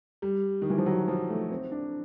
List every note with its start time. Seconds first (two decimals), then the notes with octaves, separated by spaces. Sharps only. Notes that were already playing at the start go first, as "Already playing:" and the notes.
0.22 G3
0.62 D#3
0.70 E3
0.78 F3
0.86 F#3
1.08 F3
1.30 A3
1.51 C4
1.72 D4